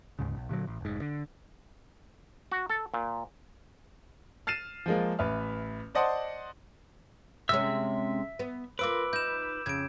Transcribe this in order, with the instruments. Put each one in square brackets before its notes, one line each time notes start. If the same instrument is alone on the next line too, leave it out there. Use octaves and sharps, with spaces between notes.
[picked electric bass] D2 G#2 C#3
B1
A#2 D3 E3 F#3
A1
F1 G#2
D3
[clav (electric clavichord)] F#4
A4
A#2
[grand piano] F6 A6 C7 D#7 E7
F3 G#3 A#3
A1 B4 E5 F6
C5 D5 D#5 F#5 A5 C6
[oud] C3 G#3 C#4 [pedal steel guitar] E5 E6
[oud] B3
[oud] A#3 F4 C5 [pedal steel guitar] B4 [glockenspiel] D6 E6 D7
[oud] D#4 [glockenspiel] G6 E7
[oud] F2 C#3 [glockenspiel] G#6 D7